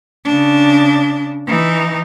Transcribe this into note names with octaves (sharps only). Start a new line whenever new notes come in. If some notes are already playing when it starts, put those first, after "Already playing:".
C#3 D4
E3 D#4